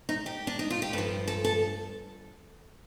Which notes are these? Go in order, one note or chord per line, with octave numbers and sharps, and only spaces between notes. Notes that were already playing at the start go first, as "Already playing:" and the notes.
D#4
G4
D4
D#4
F4
G4
G2 F3 A4
A4
A4